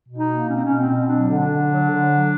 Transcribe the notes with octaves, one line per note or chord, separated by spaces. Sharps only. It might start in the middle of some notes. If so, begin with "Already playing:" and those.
B2
D#4
A#3
B2 C#4
C4
B2 C#4
C4
B2
F#3 D4
D3
D4
D3
F#3
D3
F#3